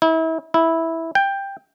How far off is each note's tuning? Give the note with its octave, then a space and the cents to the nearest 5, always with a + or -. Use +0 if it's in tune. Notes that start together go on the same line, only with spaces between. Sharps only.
E4 -35
E4 -10
G5 +10